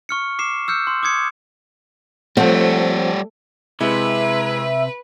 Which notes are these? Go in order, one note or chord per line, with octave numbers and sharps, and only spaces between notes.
C#6 F6 C#7
D6 C7 E7
E6 F6 G6 C#7
C6
D6 D#6 G#6 C#7
F3 G3 A3 C4 C#5 F#5
C3 G#3 E4 B4 E5